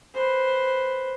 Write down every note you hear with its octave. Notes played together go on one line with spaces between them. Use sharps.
B4 C5